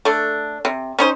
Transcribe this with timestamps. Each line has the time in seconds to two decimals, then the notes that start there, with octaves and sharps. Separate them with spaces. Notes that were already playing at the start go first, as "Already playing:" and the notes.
0.05 A3 D4
0.65 C3
0.99 C#4 D#4 C5